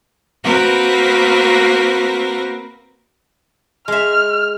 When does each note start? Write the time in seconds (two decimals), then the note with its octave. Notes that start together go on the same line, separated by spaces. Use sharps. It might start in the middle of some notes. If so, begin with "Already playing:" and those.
0.44 A#3 C4 F#4 A#4 B4
3.88 G#3 E5 F6